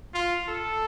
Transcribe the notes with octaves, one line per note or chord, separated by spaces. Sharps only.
F4
A4